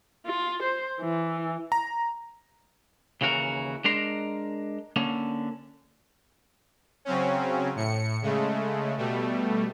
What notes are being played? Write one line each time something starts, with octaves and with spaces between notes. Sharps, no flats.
F4
C5
E3
A#5
D#2 C#3 E3 F#4 A#4
G#3 D4 A#4 A#5 C6
D3 A#3 C#4
C#3 F#3 C4 C#4
A2 C#7
C#3 G#3 A3
B2 G3 A3